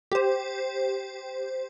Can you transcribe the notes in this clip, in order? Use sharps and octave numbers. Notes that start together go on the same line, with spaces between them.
G4 C5